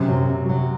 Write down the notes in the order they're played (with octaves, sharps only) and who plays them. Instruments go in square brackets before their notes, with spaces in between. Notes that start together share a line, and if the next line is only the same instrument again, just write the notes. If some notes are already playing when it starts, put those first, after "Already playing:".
Already playing: [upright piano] F#2 [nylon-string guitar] C3
[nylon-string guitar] F#3
C3
F#3